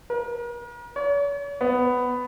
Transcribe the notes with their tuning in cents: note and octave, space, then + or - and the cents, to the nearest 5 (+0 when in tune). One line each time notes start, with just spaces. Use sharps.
A#4 +40
C#5 +45
B3 +10